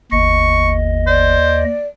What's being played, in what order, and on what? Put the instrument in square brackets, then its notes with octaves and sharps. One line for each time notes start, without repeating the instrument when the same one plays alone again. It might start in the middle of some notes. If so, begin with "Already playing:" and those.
[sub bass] G1 [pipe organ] D#2 D#5 [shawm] C#6
[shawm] C5 [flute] D5